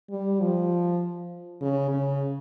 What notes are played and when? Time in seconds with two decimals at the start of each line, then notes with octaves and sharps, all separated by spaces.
0.10 G3
0.41 F3
1.61 C#3
1.90 C#3